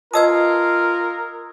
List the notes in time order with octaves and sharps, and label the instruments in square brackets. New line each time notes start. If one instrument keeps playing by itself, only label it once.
[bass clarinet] F4 [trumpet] A#4 [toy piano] B4 D#5 A5 [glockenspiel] D#6 E6 G#6